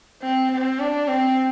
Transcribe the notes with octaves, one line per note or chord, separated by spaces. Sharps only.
C4
C4
D4
C4